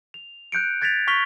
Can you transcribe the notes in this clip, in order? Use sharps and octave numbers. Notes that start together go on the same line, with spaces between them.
F7
F#6 G6 C#7 D7
F#6 G#6 A6 B6 D7 F7
C#6 F6 B6 F7 G7